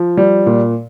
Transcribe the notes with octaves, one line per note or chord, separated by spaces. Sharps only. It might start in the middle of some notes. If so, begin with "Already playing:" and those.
Already playing: F3
G3
A#2